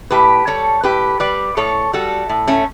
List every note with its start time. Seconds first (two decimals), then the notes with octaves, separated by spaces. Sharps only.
0.11 A2 G4 B4
0.47 G3 A4 C#5
0.83 A2 G4 B4
1.20 G3 B4 D5
1.57 A2 A4 C#5
1.93 G3 F#4 A4
2.29 A2
2.48 A3 C#4